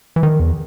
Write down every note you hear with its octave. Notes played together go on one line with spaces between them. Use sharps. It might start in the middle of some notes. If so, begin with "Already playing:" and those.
E3
D#3
E2